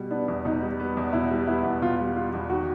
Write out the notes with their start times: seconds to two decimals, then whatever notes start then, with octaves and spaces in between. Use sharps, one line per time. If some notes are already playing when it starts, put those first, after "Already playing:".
Already playing: B2 G3
0.11 B3 D4
0.28 E2
0.45 B2 D#4
0.62 G3
0.80 B3
0.97 E2
1.13 B2 E4
1.31 G3
1.47 B3 E4
1.64 E2
1.81 B2 F4
1.99 G3
2.16 B3 F4
2.33 E2
2.50 D#3 F#4